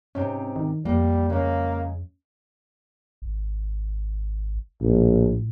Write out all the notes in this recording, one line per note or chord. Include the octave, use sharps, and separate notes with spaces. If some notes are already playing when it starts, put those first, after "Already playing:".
G#2 C3 C4 C#4
D#3
F2 G3 A#3
C#3 G#3 A#3
G#1
A#1 A2